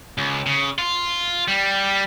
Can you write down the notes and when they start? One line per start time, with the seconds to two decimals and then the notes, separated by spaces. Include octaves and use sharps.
0.18 C#2
0.46 C#3
0.78 F4
1.48 G3